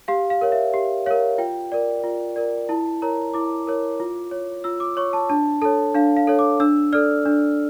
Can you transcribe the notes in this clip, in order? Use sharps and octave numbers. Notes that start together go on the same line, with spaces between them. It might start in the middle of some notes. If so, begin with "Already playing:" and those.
G4 F5
F5
A#4 C#5
E5
G4
A#4 C#5 F5
F4 G5
A#4 D5
F4
A#4 D5
E4 A5
A#4 C#5 A#5
E4 D6
A#4 C#5
F4
C#5
F4 E6
D6
C#5 C#6
A5
D4 A5
A4 C#5 A5
D4 F5
F5
A4 C#5
D6
D4 E6
A4 D5 F6
D4